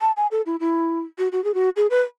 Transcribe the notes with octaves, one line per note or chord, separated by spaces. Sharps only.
A5
G#5
A4
E4
E4
F#4
F#4
G#4
F#4
G#4
B4